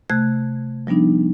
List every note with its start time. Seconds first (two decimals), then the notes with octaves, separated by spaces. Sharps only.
0.10 C3 A3 F#6 G#6
0.87 F3 G3 B3 D4 D#4